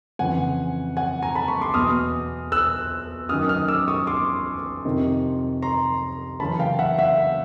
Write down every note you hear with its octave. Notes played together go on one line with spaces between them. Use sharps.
F2 C#3 E3 F#5 G#5
F#5 G#5
G#5 A#5
A5 B5
B5 C#6
C6 D6
E2 B2 D#6 F6
E6 F#6
F#2 D#3 D#6 F6
D#6 F6
D6 E6
C#6 D#6
C6 D6
F2 C3 D#3
A#5 C6
F#2 C#3 E3 A5 B5
F5 G5
E5 F#5
E5 F#5